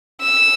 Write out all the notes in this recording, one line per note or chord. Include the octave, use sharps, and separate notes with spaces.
E6